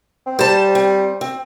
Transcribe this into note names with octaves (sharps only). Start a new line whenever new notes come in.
C4
G3 C5 A5
C4
C4